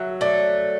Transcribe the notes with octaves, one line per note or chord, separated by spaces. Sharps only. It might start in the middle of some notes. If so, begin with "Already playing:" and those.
Already playing: F#3 E5
A3 D5